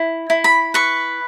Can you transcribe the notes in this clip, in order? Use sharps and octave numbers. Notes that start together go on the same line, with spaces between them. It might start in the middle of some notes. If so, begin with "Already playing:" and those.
Already playing: E4
E4
B5
B4 C#6